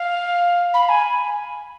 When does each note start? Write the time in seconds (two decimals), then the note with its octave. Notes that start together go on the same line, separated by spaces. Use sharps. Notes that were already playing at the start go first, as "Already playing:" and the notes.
Already playing: F5
0.74 B5
0.89 G#5